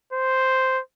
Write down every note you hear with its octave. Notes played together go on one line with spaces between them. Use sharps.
C5